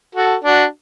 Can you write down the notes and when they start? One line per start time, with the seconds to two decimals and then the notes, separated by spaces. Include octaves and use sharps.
0.15 F#4 A4
0.44 D4 F#4